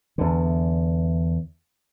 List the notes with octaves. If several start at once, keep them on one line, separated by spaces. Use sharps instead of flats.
E2 D3